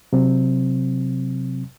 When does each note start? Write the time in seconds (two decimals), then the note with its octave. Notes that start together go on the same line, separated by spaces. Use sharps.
0.13 C3 F#3 C4